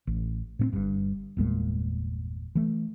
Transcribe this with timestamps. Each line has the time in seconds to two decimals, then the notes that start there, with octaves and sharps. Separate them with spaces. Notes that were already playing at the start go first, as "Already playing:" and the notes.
0.07 A1
0.59 A2 B3 C4
0.73 G1 G2
1.37 G1 E2 A#2 G#3
2.55 E3 A3